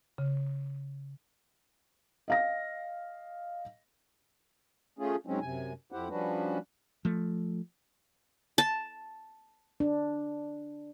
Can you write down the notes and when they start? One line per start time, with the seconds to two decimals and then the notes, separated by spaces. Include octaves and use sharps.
0.18 C#3
2.28 D#5 F5 A#6
4.99 A3 C#4 F4 G#4
5.27 G#2 F#3 G#3 C4 C#4
5.42 F#2 C3 G#5
5.92 F2 E4 G4 C5 F#5
6.10 F3 G3 C#4 D4 F#4 B4
7.05 F3 A3
8.58 A5
9.80 D4